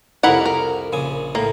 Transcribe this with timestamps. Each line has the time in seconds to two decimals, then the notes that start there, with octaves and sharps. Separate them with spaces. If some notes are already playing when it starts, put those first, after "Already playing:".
0.23 C2 F2 E4 A#4 F#5 A#5
0.46 A#4
0.93 A#1 C#3 G#5
1.35 A2 A#3